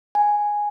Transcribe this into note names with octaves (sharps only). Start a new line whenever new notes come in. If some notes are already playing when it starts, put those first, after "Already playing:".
G#5